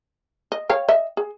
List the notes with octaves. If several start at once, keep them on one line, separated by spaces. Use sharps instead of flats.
D#5
C#5 F5 G5
D#5 E5
G#4